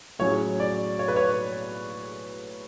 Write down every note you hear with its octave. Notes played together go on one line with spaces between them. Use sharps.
A2 F#3 C#4 G#4 C#5
D5
C#5
B4
C#5